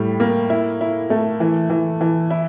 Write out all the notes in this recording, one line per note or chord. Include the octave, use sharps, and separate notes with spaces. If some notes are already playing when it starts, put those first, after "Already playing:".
Already playing: A2 G3
A#3
E4
E4
A3
E3
E3
E3
E4